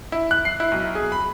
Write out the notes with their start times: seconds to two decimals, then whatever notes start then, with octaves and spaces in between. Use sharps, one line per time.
0.12 E4
0.31 F#6
0.45 C7
0.60 E4
0.72 B1
0.95 G#4
1.12 B5